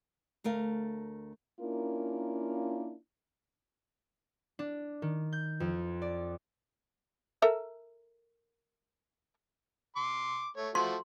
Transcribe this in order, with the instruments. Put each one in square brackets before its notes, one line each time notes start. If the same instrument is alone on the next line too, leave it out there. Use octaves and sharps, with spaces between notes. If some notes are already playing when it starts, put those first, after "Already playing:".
[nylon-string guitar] D2 A3 A#4 F5
[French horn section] A#3 C#4 D4 E4 F4 A#4
[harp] D4
D#3
G6
F2
D5
[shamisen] A4 A#4 E5
[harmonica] C6 D6
A3 C#5
[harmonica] F3 A3 F#4 [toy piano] C6